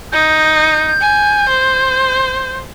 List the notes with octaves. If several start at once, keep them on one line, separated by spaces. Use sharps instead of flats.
D#4 G6
G#5
C5